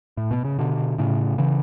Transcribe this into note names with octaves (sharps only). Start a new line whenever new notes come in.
A2
B2
C#3
B2 D3
A2 C#3
C#3 E3